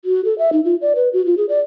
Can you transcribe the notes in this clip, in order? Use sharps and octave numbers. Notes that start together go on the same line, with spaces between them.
F#4
A4
E5
D#4
F4
D5
B4
F#4
F4
G#4
D5